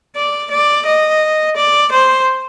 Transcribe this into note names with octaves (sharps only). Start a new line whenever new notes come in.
D5
D5
D#5
D5
C5